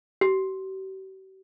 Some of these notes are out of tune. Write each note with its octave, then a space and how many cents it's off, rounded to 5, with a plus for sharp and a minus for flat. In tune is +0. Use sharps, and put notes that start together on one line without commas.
G4 -45